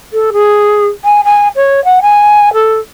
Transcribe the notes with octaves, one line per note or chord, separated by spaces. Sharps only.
A4
G#4
G#5
G#5
C#5
F#5
G#5
A4